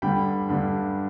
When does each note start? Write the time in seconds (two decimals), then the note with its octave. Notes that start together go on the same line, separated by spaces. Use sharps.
0.02 G2 D3 G3 D4 G5 B5
0.49 G2 D3 G3 D4